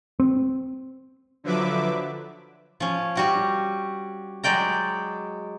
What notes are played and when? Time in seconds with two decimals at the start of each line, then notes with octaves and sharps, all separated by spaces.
0.20 C4
1.44 D3 F3 F#3 B4 E5 D6
2.80 F3 C#4
3.15 G3 F#4 G4
4.43 F#3 G#3 D5 G5 A#5